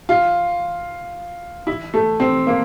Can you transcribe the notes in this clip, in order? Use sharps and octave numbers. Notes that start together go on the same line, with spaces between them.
F4
E4
A3
C4
A#3